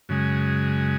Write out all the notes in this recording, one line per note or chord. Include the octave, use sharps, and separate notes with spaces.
F#2 C#3 G#3